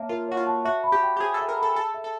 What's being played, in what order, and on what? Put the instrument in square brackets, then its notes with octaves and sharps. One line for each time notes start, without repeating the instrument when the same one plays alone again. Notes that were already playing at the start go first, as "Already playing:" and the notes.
Already playing: [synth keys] A#3 [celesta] C#5 E5 A5
[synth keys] F4 [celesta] A#4
[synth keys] F#4 [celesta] C#5
[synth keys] F4
[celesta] A5
[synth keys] F#4 [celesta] E5
[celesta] B5
[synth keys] G4
[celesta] G5
[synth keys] G4
[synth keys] G#4 [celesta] C5
[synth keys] A4 [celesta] E5
[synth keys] A#4
[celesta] B5
[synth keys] A4
[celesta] G#4 [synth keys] A4
[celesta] E5
[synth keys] A4